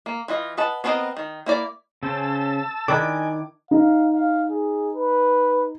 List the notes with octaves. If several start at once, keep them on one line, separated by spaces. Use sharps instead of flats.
A#3
E3 F4 D#5
B4 D#5 F#5 A5
B3 C4 D4 A#4 D#5
D#3
A#3 E4 D5
C#3 C#4 C5 A5 E6
D#3 D4 E4 D5 D#5 G#5 D6
D#4 F5
F5
G#4
B4